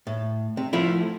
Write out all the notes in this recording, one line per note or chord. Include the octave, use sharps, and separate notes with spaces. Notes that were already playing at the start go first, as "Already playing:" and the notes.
A2
C3
F3 A3 E4